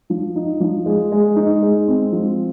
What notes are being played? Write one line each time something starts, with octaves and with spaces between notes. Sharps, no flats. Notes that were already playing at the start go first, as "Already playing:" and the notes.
F3
D#4
F3
G#3
G#3
D#4
G#3
C4
F3